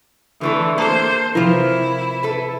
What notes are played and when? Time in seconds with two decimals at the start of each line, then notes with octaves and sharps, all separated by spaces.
0.41 D3 E3 A3 A4
0.78 A#3 A4 C5 A5
1.35 C3 E3 F3 E4 F4 A#4 A#6
2.23 A4 B4